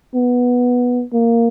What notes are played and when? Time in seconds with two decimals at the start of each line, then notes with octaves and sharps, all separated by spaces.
0.15 B3
1.13 A#3